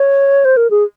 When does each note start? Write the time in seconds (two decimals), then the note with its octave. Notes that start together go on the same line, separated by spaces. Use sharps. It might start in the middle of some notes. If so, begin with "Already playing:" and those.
Already playing: C#5
0.45 C5
0.57 A#4
0.70 G#4